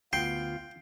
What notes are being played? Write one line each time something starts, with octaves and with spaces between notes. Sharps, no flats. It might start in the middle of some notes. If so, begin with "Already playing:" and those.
D2 B3 F4 G5 C7